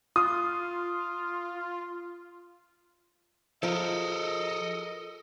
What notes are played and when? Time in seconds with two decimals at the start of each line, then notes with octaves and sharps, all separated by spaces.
0.16 F4 D#6
3.63 F3 A4 A#4 D#5